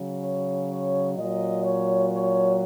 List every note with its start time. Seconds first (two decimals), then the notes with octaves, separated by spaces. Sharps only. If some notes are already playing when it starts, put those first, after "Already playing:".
Already playing: C#3 F#3
0.23 C#5
0.70 C#5
1.17 A#2 F#3 D#5
1.64 C#5
2.12 C#5